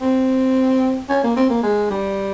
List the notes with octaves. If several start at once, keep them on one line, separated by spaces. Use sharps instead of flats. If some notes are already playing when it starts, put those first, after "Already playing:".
C4
C#4
A#3
C4
A#3
G#3
G3